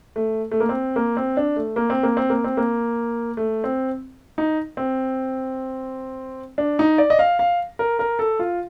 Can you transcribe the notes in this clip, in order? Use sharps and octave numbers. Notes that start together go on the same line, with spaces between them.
A3
A3
A#3
C4
A#3
C4
D4
A3
A#3
C4
A#3
C4
A#3
C4
A#3
A3
C4
D#4
C4
D4
D#4
D5
D#5
F5
F5
A#4
A#4
A4
F4